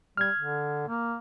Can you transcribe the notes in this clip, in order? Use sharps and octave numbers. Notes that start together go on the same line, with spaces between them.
G3 F6 G#6
D3
A#3